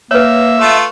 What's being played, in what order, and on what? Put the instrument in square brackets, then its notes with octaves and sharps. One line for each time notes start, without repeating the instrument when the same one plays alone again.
[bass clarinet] A#3 [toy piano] B4 C#5 [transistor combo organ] E5
[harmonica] A3 F4